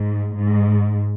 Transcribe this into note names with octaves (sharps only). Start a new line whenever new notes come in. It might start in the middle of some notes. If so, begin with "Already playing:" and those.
Already playing: G#2
G#2